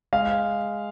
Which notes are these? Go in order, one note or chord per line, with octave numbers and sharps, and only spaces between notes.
G#3 F5